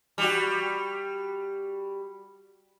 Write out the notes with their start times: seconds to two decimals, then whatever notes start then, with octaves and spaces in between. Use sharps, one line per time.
0.18 G3 F#4